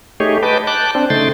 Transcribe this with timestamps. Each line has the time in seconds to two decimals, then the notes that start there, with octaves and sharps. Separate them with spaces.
0.20 A3 D#4 G4 G#4 C#5
0.43 B4 D#5 G5 A5 D6
0.67 A5 D6 F#6 G6
0.95 C4 D4
1.10 C#3 A3 D#4 G5 C6 A6